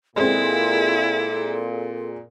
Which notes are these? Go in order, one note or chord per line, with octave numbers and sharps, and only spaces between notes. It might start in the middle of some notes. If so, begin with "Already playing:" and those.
A#2 G#3 C4 E4 A4